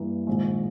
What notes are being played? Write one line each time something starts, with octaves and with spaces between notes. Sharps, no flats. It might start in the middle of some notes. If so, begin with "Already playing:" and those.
Already playing: G2 E3 A#3
A#1 G#2 D#3 G#3